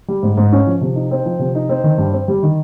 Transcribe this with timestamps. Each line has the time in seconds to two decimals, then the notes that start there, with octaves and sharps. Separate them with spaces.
0.08 G3
0.23 G#2
0.37 G#2
0.53 C#4
0.67 F3
0.81 C3
0.96 D#4
1.11 C4
1.26 F3
1.39 C3
1.55 D#4
1.69 C4
1.84 D#3
1.98 G2
2.13 C4
2.28 G3
2.43 D#3